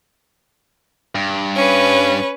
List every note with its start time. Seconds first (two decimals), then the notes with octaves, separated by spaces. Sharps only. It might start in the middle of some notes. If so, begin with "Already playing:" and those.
1.15 G2
1.56 C#4 B4